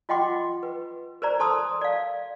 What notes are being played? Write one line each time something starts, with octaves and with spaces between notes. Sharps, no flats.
F4 D#5 F#5 G5 C6 D6
B4
A#4 C5 D5 A#5
A4 C5 A5 C6 D#6 E6
D5 F5